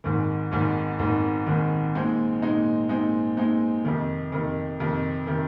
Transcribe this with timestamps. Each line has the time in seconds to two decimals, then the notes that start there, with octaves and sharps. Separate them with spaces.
0.04 G#1 G#2 D#3
0.51 G#1 G#2 D#3
0.99 G#1 G#2 D#3
1.46 G#1 G#2 D#3
1.94 A#2 G#3 C4 D#4
2.42 A#2 G#3 C4 D#4
2.89 A#2 G#3 C4 D#4
3.37 A#2 G#3 C4 D#4
3.85 F2 C3 D#3
4.32 F2 C3 D#3
4.80 F2 C3 D#3
5.27 C3 D#3